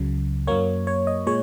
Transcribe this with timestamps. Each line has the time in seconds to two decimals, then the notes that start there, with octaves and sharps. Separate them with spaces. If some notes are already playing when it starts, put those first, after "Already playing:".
Already playing: C#2 C#3 F#3
0.47 F#2 F#3 A#3 C#5
0.87 C#5
1.07 D#5
1.27 A#2 G#3 C#5